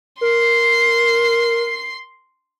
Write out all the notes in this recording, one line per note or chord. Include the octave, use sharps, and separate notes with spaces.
A#4 C6 C7